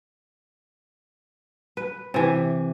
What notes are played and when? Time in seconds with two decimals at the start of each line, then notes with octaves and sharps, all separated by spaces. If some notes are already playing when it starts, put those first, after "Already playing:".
1.77 B4
2.14 C3 E3